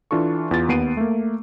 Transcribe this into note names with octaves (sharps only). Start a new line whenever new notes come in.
E3 D4 F4 A4 C#6
E2 F4 A6
D#2 B3 C7 D7 D#7
A3 A#3